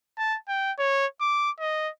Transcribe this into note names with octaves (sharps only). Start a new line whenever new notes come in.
A5
G5
C#5
D6
D#5